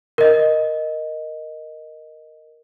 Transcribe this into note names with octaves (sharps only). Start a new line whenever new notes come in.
A#4 D#5